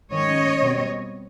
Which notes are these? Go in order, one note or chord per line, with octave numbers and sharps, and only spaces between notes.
D#3 G#3 C#4 C#5 D#5
B2 G3 C4